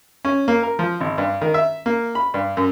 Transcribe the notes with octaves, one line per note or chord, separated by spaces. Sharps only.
C#4
A#3
A#4
F3
G#1
G2
D#3
E5
A#3
B5
G2
F#2